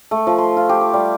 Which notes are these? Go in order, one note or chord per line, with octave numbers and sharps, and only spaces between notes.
A3
F3
C6
F4
G4
D6
G3